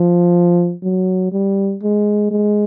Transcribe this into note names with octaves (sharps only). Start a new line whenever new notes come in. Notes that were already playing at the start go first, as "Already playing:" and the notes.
Already playing: F3
F#3
G3
G#3
G#3